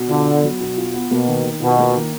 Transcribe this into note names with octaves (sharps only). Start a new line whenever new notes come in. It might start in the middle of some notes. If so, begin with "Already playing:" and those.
Already playing: B2
D3 F4
B3
F#3
B2
F4
B3
B2 A#3
D#3
D#3
B2 F4
A#3
D#3